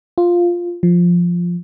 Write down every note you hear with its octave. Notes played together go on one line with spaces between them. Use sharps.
F4
F3